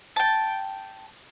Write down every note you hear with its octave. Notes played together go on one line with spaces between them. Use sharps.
G5 A5